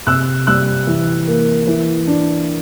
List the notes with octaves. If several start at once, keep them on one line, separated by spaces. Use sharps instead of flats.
C3 E6 F#6
G3 E6 F#6
E3
A#3
E3
D4